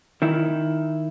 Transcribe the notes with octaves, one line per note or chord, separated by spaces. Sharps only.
D#3 E4